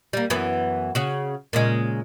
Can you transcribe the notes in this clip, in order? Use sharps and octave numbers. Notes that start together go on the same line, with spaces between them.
G3 A#3
F#2 E3 B3
C#3 F#4
A#2 C#3 G#3